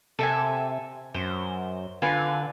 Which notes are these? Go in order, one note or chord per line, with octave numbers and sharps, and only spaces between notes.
C3 A4 E5 G#5
F#2 C5
D3 F4 B4 G#5